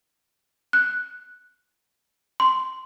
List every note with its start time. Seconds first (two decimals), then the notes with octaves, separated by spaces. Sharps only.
0.73 F#6
2.40 C6